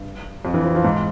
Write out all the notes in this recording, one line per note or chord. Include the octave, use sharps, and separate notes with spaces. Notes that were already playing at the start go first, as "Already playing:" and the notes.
Already playing: G2
F2
E3
F3
F3
G#2